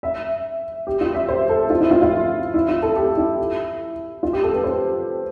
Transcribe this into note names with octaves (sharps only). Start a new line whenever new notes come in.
E5
G4
F4
E5
C5
A4
F4
E4
F4
F4
E4
F4
A4
G4
E4
F4
G4
A4
B4
C5